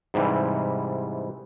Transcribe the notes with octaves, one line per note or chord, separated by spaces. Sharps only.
G#2 C3 E3 G3